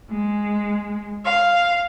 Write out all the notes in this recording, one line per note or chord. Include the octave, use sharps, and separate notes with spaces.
G#3
F5